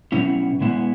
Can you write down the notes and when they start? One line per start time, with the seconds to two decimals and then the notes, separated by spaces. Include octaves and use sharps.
0.12 B2 F#3 C#4 E4
0.60 B2 G#3 B3 E4